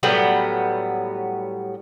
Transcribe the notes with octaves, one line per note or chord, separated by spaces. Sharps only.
A2 F#3 G3 B3